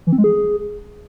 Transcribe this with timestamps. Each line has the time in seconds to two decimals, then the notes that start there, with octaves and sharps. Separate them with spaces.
0.07 E3
0.12 C4
0.18 G#3
0.24 G#4